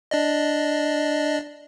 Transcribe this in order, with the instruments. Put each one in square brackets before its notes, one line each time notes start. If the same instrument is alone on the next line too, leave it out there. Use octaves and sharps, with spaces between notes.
[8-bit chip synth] D4 D5 D#5